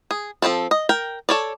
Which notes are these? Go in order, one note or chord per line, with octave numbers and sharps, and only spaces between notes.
G#4
F3 F#3 C4 A4
D#5
A#4 G5
A4 C#5 D5